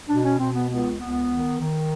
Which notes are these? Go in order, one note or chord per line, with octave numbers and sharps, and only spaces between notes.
B2 D4
C#4
B2 C4
B3
C#2 B3
C#2 B3
D#3
D#3